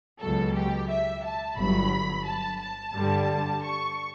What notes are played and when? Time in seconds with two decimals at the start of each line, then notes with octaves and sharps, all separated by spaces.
0.20 C#2 B2 F#3 A4
0.55 G4
0.89 E5
1.24 A5
1.57 G1 G2 F#3 B5
2.26 A5
2.60 A5
2.95 G2 D3 G3
3.64 C#6